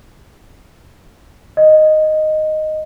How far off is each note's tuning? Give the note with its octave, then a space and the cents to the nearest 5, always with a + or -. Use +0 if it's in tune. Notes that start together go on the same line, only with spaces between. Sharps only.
D#5 -5